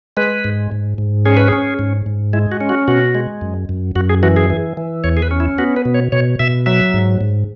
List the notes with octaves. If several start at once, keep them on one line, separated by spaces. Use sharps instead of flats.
G#3 B4
G#2
G#2
G#2
C#4 G#4
B4
C#4 G#4
G#2
G#2
G#3 E4
F#4
C#4
F#4
B2 F#4
G#3
F#2
F#2
F#2 F#4
G#4
E3 F#4
G#4
E3
E3
E2 C#5
G#4
B4
C#4
E4
B3 F#4
B4
B2
C#5
B2 C#5
B2 E5
F#3 E5
G#2
G#2